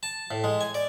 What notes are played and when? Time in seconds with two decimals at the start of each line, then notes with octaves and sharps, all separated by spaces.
0.03 A5
0.31 A2
0.44 G#3
0.61 G#5
0.74 D5